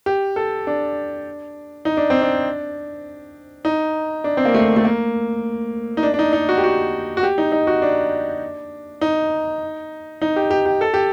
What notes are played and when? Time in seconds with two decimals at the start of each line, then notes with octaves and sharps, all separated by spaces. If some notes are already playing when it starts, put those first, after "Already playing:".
0.06 G4
0.36 A4
0.67 D4
1.85 D#4
1.97 D4
2.10 C4
2.22 D4
3.65 D#4
4.24 D4
4.37 C4
4.45 A#3
4.54 A3
4.76 A3
4.85 A#3
5.97 D#4
6.03 D4
6.14 D4
6.19 D#4
6.33 D#4
6.49 F#4
6.57 G4
6.64 F#4
7.17 F#4
7.23 G4
7.38 D#4
7.52 D#4
7.67 F#4
7.82 D4
9.01 D#4
10.22 D#4
10.36 G4
10.50 G4
10.66 G4
10.81 A4
10.94 G4